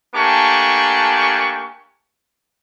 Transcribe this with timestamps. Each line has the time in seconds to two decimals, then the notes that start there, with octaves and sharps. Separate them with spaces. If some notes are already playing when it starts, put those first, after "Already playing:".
0.15 A3 A#3 D4 G4 G#5 C#6